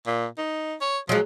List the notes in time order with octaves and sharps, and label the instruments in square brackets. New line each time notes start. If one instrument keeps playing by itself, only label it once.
[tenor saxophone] A#2
D#4
C#5
[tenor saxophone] F3 [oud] F#3 G#3